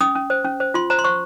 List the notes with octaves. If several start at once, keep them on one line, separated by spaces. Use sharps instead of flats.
C#4 D#6
C#4
C5
C#4
C5
F4 C6
C5 A#5
C6
C5 C#6